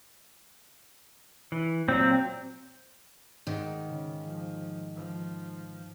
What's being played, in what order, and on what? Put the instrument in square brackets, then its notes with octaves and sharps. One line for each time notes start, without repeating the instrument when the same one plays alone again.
[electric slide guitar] E3
[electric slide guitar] A#2 F#3 [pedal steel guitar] C4
[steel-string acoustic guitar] G#2 D#3
[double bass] C#3
F3
F3